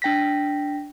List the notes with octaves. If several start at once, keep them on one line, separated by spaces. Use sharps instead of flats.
D4 G5 A#6 B6